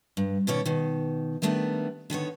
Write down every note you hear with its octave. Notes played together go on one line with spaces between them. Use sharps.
G2
B2 D#3 C#4 C#5 D5
B2 D#3
D#3 G3 A3 B3 D4
D3 D#3 B3 C#5